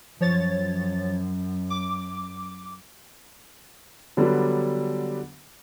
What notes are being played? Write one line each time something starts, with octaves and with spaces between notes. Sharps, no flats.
F#2 F3 C#5 A6
D6
D3 F#3 G3 B3 D4